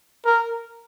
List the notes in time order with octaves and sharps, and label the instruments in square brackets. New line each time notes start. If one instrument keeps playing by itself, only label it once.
[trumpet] A#4